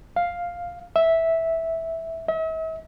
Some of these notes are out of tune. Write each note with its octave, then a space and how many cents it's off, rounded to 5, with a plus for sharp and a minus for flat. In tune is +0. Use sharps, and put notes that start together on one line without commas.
F5 +5
E5 -10
E5 -45